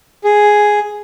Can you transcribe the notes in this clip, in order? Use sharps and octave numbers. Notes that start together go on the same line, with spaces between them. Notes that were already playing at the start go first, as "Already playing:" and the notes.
G#4